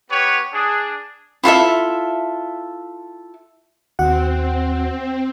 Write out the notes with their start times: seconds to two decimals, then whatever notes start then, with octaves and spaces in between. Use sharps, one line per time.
0.11 B3 G4 B4 C#5
0.53 D4 G#4
1.43 E4 F4 A4 E5
3.99 D#2 C4 F#4 F#5